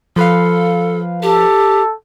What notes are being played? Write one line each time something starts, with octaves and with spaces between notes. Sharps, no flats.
F3 A4 B4 F5
G4 A4